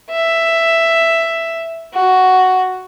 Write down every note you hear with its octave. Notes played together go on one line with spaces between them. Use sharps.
E5
F#4